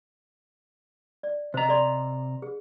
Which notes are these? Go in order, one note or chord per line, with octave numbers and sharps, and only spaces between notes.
D5
C3 C5 D#5 A#5
A4 D5 C6
G#4